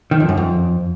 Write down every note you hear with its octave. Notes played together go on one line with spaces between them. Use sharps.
D#3
F2
F#2
F2